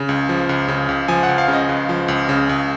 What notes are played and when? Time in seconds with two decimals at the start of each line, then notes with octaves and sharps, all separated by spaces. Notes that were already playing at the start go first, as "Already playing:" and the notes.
Already playing: C#3
0.09 C#2
0.29 F3
0.49 C#2
0.68 C#3
0.89 C#2
1.08 F3 G#5
1.23 F#5
1.29 C#2
1.38 F5
1.48 C#3
1.53 D#5
1.69 C#2
1.89 F3
2.08 C#2
2.29 C#3
2.49 C#2